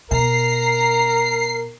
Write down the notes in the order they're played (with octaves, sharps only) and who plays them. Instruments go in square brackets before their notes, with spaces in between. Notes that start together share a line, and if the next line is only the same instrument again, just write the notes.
[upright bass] B2 [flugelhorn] A#4 [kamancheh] A#5 [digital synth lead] C7